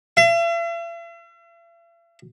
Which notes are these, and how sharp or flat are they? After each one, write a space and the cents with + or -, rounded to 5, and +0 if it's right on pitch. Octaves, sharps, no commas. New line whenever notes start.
E5 +45